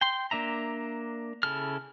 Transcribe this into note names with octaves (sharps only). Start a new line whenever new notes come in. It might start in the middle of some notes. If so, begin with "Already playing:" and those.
G5 C6
A#3 D4 E5 A#5
C#3 E4 A4 F6